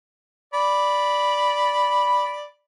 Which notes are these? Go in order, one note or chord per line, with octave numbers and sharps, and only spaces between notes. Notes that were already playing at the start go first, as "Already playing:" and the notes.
D5 B5